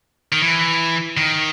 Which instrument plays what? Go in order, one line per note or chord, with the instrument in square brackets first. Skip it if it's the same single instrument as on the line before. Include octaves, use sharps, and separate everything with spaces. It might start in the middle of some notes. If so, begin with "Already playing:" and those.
[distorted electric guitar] D#3
E3
D#3